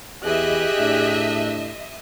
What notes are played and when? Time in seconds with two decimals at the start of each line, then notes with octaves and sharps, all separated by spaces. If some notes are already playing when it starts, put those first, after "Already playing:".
0.24 E2 E3 G4 G#4 D#5 E5 F#6
0.78 A2 D4